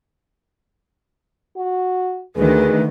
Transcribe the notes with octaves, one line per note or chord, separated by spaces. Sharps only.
F#4
D2 D#3 G#4 B4